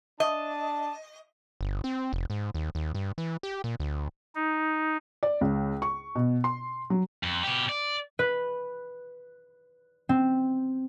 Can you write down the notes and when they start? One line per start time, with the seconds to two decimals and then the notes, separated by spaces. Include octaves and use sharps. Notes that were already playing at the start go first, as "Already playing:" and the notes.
0.20 D4 D#5 A5
1.61 G1
1.84 C4
2.13 F1
2.30 G#2
2.55 D#2
2.75 D#2
2.95 G2
3.18 E3
3.43 G4
3.64 A#2
3.80 D2
4.35 D#4
5.23 D5
5.41 C#2
5.82 C#6
6.15 B2
6.44 C6
6.90 F#3
7.23 F2
7.43 B2 G4
7.69 D5
8.19 B4
10.09 C4